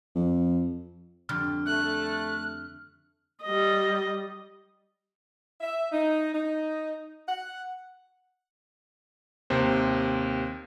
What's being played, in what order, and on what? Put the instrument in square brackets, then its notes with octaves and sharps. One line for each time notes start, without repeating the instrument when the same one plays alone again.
[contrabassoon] F2
[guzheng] F2 D3 G3 [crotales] F6
[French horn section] A3 [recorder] F#6
[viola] G3 D#5
[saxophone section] E5
D#4
D#4
F#5
[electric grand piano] D#2 C3 C5